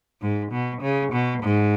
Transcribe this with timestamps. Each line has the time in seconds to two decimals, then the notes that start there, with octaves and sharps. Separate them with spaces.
0.21 G#2
0.51 B2
0.82 C#3
1.12 B2
1.43 G#2